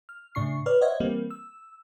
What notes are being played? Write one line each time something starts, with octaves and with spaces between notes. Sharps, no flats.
F6
A2 C#3 D4 C#6 C7
B4 C#5 D5 F6
C5 C#5 D#5 E5 F#5 G#6
E3 G3 A#3 C4
E6